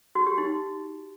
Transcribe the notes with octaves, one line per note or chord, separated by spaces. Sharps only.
F#4
G4
D#4